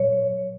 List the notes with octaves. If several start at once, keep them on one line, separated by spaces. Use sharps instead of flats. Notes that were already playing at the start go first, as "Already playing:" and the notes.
Already playing: A#2 F#3 C#5